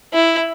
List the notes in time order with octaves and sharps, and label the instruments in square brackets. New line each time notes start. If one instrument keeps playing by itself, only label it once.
[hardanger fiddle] E4